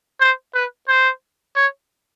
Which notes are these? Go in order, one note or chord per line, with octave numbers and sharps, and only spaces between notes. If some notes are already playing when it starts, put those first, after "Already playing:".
C5
B4
C5
C#5